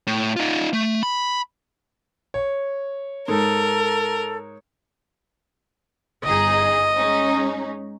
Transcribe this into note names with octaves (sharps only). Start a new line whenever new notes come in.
A2
D#4 F4
A3
B5
C#5
G#2 A4 A#4
G1 D#4 G#4 D#5
G#3 C#4 D#4